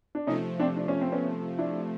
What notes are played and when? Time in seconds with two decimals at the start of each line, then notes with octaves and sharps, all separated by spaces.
0.15 D4
0.27 C3 F3 A3 C#4 D#4
0.59 C4 D4
0.77 D4
0.88 C#4
1.01 C4
1.12 B3 C#4
1.58 D4 E4